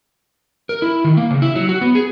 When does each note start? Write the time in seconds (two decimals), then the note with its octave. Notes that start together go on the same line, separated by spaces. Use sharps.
0.69 A#4
0.82 E4
1.04 D#3
1.17 A#3
1.31 C#3
1.42 E4
1.55 F#3
1.69 F#4
1.81 B3
1.95 G#4